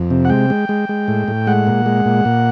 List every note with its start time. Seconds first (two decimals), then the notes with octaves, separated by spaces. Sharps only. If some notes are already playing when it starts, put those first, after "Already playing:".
Already playing: F2
0.10 C3
0.25 F#5
0.30 G#3 G5
0.50 G#3
0.69 G#3
0.89 G#3
1.08 A2
1.28 A2
1.47 G#3 F#5
1.67 A#2
1.86 G#3
2.05 A#2
2.25 A#2